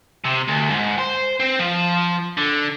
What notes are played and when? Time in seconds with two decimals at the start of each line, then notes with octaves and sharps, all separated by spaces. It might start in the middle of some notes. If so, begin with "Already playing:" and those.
0.25 C3
0.48 D2
0.70 G#2
0.99 C5
1.40 C4
1.59 F3
2.37 D3